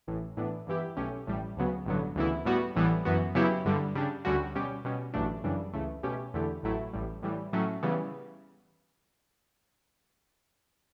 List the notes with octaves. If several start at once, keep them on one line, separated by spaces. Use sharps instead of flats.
A1 A2 E3
A2 E3 B3 D4
G2 E3 B3 E4 G4
B1 B2 A3 C#4 G4
A1 A2 G3
D2 C#3 F#3 B3
A1 G2 D3 F#3 B3
D2 C#3 E3 B3 E4
A2 G3 B3 F#4
A1 A2 E3 G3 B3
F#2 E3 B3 F#4
C#3 F#3 B3 E4 G4
G2 D3 G3
C#3 G3 D4
D2 D3 G3 C#4 F#4
B2 G3 C#4 G4
B2 G3 C#4
A1 G2 F#3 A3 D4
F#2 C#3 E3 G3 D4
C#2 C#3 E3 A3
B2 A3 C#4 G4
E2 D3 A3 E4 G4
A1 A2 F#3 A3 E4
A1 A2 G3
A2 E3 G3
A2 F#3 A3 C#4
C#3 E3 G3 B3